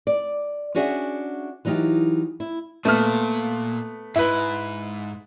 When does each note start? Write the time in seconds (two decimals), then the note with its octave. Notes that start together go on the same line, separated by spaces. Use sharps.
0.07 D5
0.75 C#4 D4 F#4 G#4 E5 F#5
1.65 E3 F#3 D#4 F4 G4
2.40 E4
2.85 A#2 A3 B3 F6
4.16 G#2 E4 B4